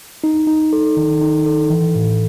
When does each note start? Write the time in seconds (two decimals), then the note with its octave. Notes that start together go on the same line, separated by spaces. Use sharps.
0.24 D#4
0.47 D#4
0.73 A4
0.97 D#3
1.21 D#4
1.46 A4
1.70 E3
1.95 A2